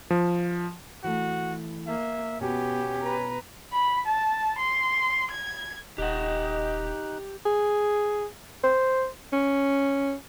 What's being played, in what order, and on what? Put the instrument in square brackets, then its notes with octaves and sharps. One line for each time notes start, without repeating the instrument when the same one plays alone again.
[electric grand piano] F3
[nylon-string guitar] E3 A3 [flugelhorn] F#4
[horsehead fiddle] A#3 [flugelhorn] E5
[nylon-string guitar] B2 [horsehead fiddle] B3 [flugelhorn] C#4 [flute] G4
[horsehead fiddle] B4 A#5
[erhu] B5
A5
C6
G#6
[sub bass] D#1 [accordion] D#4 F#6 [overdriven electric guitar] G4 F#5 [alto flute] D#5
[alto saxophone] G#4
C5
C#4